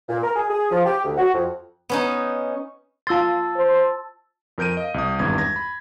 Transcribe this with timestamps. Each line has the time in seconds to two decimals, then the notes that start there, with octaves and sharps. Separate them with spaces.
0.09 A#2
0.23 A#4
0.35 G#4
0.49 G#4
0.70 F3
0.85 G4
1.04 D2
1.18 F#4
1.34 F2
1.89 B3 C#4 D#4
3.07 F4 A5 C6 E6 A6
3.56 C5
4.58 F2 A#4 G6 D7 D#7
4.77 D#5 F5
4.94 C2 D#6
5.19 G#1 E2 G2 G#6
5.38 G#6 A#6
5.56 B5